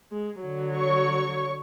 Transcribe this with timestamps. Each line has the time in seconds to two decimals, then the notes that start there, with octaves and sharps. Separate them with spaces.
0.11 G#3
0.40 D3 F#3
0.76 C#5 C#6